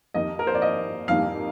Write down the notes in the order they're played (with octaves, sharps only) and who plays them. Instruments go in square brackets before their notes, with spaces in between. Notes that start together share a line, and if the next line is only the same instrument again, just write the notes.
[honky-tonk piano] F2 D#3 A#3 D#4 G4 [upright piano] D#5
[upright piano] A#4
C5
D5
D#5
[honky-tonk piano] F2 D#3 G3 A#3 D#4 [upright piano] F5